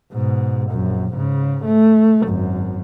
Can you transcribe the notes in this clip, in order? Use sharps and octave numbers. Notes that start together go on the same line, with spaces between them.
G#2 B2
A#1 F#2
G#2 C#3
A3
G#1 F#2